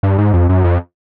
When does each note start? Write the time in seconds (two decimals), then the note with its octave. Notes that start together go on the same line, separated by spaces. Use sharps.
0.03 G2
0.18 G#2
0.33 F2
0.49 F#2
0.64 F2